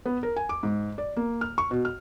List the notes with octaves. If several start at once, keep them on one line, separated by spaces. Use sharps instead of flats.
B3
A#4
G#5
D6
G#2
D5
A#3
F6
C#6
B2
F6